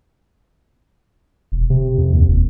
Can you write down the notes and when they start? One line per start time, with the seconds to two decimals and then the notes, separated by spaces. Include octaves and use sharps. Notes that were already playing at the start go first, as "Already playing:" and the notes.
1.52 E1
1.70 C3
1.98 F2
2.13 D#2
2.28 E1